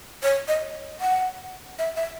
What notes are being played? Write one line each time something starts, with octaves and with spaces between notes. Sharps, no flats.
C#5
D#5
F#5
E5
E5